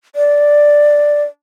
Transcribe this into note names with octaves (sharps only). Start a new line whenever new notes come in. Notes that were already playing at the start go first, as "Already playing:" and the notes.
D5